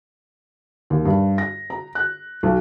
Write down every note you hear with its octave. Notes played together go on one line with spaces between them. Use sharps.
D#2
G2
A#6
A#5
F#6
B1